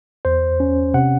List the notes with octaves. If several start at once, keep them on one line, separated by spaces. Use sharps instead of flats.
E2 C5
C#4
C3 F#5